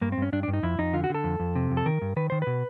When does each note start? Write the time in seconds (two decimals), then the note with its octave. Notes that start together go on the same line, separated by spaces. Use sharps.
0.01 G2 A#3
0.12 C4
0.18 G2 C#4
0.32 G2 D4
0.43 G2 D4
0.53 D#4
0.63 F2 E4
0.79 F2 D#4
0.93 D3 F4
1.04 F#4
1.10 D3 A4
1.24 F2
1.40 F2
1.55 C3
1.71 F2
1.77 A4
1.86 D#3 A#4
2.02 G2
2.16 D#3 B4
2.30 D#3 C5
2.42 B2 B4